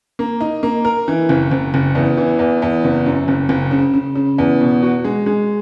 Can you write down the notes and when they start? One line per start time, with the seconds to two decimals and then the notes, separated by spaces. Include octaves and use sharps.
0.19 A#3
0.41 D#4
0.63 A#3
0.85 A#4
1.08 E3
1.29 F#1
1.51 F#1
1.74 F#1
1.95 E2
2.17 E3
2.39 E2
2.62 E2
2.84 F#1
3.06 F#2
3.28 F#1
3.49 F#1
3.71 C#3
3.94 C#3
4.15 C#3
4.38 E2
4.60 B2
4.83 F#4
5.04 G#3
5.26 G#3